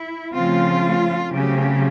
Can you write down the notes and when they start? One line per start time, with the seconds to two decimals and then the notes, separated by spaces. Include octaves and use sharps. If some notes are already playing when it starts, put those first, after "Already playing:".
Already playing: E4
0.33 C#3 F3 A3 C4 F4
1.31 C#3 F#3 A3 C4 G4